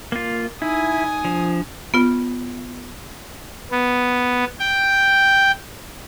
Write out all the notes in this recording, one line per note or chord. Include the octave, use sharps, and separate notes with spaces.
A#3 F4
D#4 E4 G#5 D#6
F3 D4
B3 F4
B3
G5